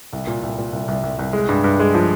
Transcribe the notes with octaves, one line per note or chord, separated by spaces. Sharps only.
C2
A#2
C2
A#2
C2
C2
C2
C2
G#3
G2
G2
G#3
F3